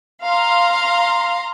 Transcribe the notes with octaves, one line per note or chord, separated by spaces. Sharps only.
F5 A#5 C6